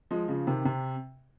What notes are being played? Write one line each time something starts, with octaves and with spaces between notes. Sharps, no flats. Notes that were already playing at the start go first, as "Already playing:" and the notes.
F3 G#3
C#3 F3
C3 D#3
C3